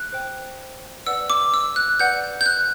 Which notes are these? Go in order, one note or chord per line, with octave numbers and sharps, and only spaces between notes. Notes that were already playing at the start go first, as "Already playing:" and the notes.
Already playing: F#6
C5 G5
B4 D5 F#5 E6
D6
E6
F#6
B4 D5 F#5 G6
G6
F#6